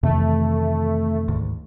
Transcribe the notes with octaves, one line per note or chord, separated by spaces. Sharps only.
F2 C3 D#3 E3 A3
D2 G#2 D#3